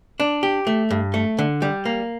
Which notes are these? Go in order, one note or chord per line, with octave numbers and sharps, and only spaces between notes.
D4
G4
A3
G2
A3
D3
G3
A#3